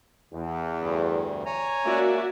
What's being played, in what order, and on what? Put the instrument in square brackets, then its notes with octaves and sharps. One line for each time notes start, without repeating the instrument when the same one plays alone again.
[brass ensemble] E2
[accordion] D2 G2
C#5 G#5 A#5
[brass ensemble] A#3 C#4 [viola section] F#4 D5 E5